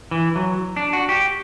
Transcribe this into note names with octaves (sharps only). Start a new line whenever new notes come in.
E3
F#3
D4
F#4
G4